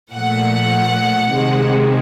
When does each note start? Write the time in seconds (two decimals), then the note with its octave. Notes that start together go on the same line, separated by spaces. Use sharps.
0.14 A#2 F3 A3 F#5
1.31 C3 D#3 G#3